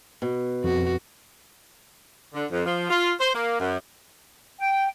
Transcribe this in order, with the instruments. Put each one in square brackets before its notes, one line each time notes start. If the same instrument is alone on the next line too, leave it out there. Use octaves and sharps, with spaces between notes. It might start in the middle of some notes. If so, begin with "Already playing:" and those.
[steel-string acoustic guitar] B2
[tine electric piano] F2 [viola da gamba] F#4
[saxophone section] D3
F2
F3
F4
C5
A#3
F#2
[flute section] G5